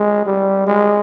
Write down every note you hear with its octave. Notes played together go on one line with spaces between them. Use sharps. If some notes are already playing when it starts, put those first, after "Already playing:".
Already playing: G#3
G3
G#3